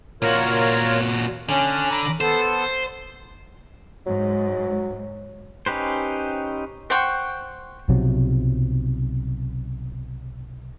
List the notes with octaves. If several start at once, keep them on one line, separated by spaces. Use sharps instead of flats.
A#2 F4 F#4 A#4 C#5
D3 C#4
A#5 B5 D6
B3 A4 C5
G#2 F#3
C#4 D#4 G4 B4 C5
C5 F#5 G5 C#6
B1 C3 F3 F#3